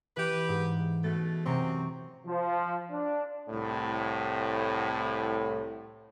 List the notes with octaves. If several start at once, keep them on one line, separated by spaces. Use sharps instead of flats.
E3 G4 B4
G#2
B2 A3 A6
F#2 C3 C4 A#5 C#6
F3
D4
C2 A2